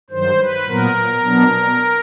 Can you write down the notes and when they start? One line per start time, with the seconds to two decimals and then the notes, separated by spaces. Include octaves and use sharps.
0.10 G2 D#3 F#3 C5
0.38 B4
0.67 A#2 F#3 B3 A#4
1.24 B2 F#3 B3 D4